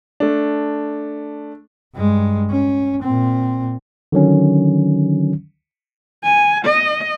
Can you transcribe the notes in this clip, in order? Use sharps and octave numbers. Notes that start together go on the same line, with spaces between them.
A3 D4
G2 G#3
C#4
A#2 C4
D3 D#3 F#3 C#4
G#5
D#5